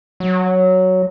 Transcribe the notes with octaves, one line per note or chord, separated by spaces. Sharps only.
F#3